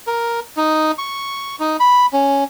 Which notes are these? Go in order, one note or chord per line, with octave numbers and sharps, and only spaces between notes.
A#4
D#4
C#6
D#4
B5
C#4